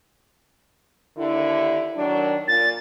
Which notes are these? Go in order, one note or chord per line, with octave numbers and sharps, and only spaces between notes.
D#2 D3 E4
D#3 F#3 D4
A#2 A6